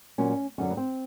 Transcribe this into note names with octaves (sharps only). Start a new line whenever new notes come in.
A#2 F#3 C#4
F#2 D3 F#3 C#4
B3
C4